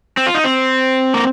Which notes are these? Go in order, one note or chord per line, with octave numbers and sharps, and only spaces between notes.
C4
F4
D#4
C4
A#3